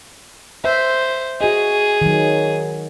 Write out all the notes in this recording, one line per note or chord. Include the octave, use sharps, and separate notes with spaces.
C5 E5
F#4 G#4 D#5
D#3 F#3